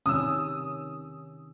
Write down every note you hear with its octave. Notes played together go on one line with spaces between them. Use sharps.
C3 D#3 C#4 D#6 E6